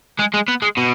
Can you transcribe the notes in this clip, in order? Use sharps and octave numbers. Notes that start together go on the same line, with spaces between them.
G#3
G#3
B3
G#3
B2